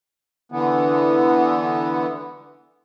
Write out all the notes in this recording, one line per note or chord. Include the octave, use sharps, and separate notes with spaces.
D3 E3 B3